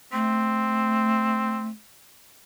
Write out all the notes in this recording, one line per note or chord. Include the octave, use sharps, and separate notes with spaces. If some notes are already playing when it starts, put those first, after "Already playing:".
A3 C4